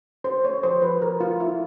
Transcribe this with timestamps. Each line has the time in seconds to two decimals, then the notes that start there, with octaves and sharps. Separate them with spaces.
0.24 C#4 C5
0.44 A3 C#5
0.63 F3 C5
0.82 F3 B4
1.02 F3 A#4
1.20 A3 F4
1.40 A3 E4